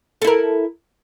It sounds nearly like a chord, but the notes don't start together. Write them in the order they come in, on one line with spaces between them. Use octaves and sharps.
A4 E4 A#4